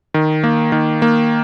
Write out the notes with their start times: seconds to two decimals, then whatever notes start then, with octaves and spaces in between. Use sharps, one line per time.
0.14 D#3
0.44 A#3
0.72 D#3
1.02 A#3